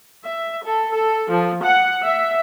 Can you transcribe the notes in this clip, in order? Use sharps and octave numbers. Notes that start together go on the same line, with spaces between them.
E5
A4
A4
F3
F#5
E5